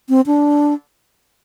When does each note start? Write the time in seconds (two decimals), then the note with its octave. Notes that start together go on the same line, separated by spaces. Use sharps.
0.09 C4
0.26 D4